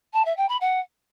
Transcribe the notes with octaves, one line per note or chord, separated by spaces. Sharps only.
A5
E5
G5
B5
F#5